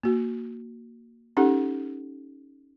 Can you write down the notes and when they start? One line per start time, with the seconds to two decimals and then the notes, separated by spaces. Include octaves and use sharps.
0.03 A#3 F#4
1.37 C#4 D#4 G4 A4 F#5